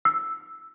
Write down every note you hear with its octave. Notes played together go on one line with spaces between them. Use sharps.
E6